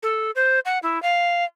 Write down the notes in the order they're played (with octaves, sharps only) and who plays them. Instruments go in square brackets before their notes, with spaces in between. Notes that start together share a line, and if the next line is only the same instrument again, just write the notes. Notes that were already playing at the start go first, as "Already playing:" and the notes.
[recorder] A4
C5
F#5
E4
F5